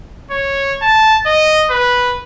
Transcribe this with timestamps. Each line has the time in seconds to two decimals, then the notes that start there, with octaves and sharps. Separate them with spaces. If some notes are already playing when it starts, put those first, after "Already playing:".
0.31 C#5
0.82 A5
1.26 D#5
1.71 B4